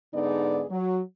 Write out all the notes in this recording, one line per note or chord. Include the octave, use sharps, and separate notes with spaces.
G#2 D3 B3 D#4 G#4 D5
F#3